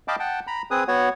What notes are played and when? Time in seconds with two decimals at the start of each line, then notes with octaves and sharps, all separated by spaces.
0.08 D#5 F5 G5 A5 B5 D6
0.19 F#5 G5 A5
0.47 A#5 B5
0.71 C4 G#4 B4 D#6
0.88 B3 F#4 C#5 F#5